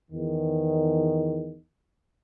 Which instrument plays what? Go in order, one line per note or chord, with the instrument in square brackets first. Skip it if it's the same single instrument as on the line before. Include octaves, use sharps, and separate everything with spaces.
[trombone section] E2 D#3